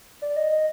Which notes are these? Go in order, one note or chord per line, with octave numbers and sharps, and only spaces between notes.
D5
D#5
D#5